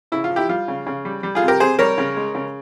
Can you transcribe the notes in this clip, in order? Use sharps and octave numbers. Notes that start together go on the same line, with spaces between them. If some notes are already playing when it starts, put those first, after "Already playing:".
C#3 E4
F4
F3
E4 G4
G3 F4
C#3
C#3
G3
G3
F4 G#4
C3
G4 A#4
C3 G#4 C5
G3 A#4 C#5
C#3
G#3
C#3